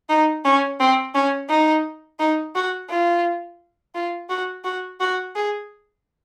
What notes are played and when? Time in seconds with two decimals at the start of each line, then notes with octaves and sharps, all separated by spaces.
0.09 D#4
0.45 C#4
0.80 C4
1.15 C#4
1.49 D#4
2.20 D#4
2.55 F#4
2.90 F4
3.95 F4
4.30 F#4
4.65 F#4
5.00 F#4
5.36 G#4